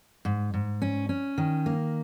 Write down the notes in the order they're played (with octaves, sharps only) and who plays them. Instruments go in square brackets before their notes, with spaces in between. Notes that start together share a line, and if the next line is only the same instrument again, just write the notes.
[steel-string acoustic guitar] G#2
G#2
C#4
C#4
D#3
A#3